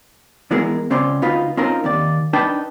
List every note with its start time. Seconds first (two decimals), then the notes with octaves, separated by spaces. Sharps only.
0.51 E3 G#3 B3 E4 G#4 A#4
0.90 C#2 C4 C#4 D5 C6
1.22 D2 D#4 F4 B4 D#5 F5
1.57 C4 C#4 D#4 F4 A#4
1.84 D#2 D#3 D5
2.33 D4 D#4 B4 D#5 G5 A5